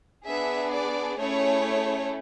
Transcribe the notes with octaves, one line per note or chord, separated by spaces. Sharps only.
B3 D4 G#4 E5
D5
A3 C#4 E4 G#4 C#5